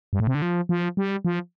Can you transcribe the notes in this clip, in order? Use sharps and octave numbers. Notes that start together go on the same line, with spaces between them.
G2
A2
C3
D3
F3
F3
G3
F3